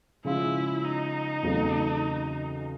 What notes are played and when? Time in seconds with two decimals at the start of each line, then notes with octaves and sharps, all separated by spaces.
0.25 C#3 F3 G#3 C#4 E4 F4
0.84 D#4
1.43 E2 C#3 F#3 A3 C4